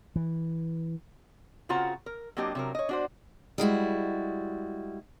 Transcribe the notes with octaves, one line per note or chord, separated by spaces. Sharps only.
E3
C#3 C4 F4 F#4 F#5 A#5
A#4
F#3 A#3 C4 D4 G4 D#5
C3 F#3 A#4
C#5 D#5
D4 F#4 C5
G3 G#3 E4 F#4